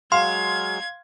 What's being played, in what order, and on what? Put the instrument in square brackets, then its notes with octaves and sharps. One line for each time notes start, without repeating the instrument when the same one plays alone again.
[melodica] F#3 G#3 [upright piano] F5 [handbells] C6 [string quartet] G#6